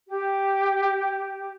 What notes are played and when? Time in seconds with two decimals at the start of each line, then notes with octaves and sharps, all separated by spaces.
0.09 G4